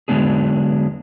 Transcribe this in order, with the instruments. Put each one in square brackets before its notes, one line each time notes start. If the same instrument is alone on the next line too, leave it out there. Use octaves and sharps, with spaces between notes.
[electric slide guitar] D3 F#3 G#3 B3 D4 G#4